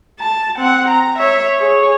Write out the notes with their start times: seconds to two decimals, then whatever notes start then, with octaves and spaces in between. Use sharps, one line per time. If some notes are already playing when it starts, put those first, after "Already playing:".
0.19 A5
0.57 C4 F#5
0.88 A#5
1.19 C#5 E5
1.58 G#4 C#5